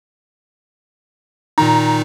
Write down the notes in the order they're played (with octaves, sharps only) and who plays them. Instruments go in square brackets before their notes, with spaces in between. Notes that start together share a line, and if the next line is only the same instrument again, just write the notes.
[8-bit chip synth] A#2 D#3 D#4 [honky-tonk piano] A#5